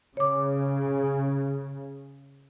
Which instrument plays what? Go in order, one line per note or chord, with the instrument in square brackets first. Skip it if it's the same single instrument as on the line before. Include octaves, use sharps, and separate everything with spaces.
[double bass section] C#3 [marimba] C#5 D6